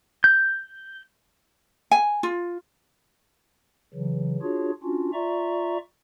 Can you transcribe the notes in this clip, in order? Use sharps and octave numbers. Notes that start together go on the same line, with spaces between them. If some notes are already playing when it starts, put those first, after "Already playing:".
G6
G#5
F4
C#3 E3 F#3
D4 F4 F#4 G#4 C#5
C#4 D4 F4 F#4
F4 D5 E5 A#5 C#6